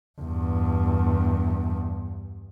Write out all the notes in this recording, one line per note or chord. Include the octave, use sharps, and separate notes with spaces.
E2 G2